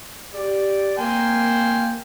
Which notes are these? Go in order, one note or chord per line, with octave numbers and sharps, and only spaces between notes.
G4 D5
A#3 G5 G#5 C6